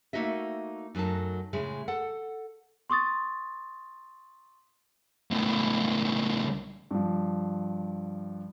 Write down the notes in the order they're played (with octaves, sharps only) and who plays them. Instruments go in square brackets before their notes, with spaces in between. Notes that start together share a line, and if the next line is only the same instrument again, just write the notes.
[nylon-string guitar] A3 A#3 D#4 F#4 D#5 E5
F#2 F#3 A3 D#4 A5
A2 C#3 G#3
A4 F#5
[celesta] C6 C#6 D#6 A6
[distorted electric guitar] C#2 A2
[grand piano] G2 F3